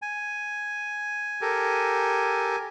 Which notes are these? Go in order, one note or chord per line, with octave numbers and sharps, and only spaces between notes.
G#5
G4 A4 A#4